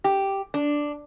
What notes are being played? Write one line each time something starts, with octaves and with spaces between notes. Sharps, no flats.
G4
D4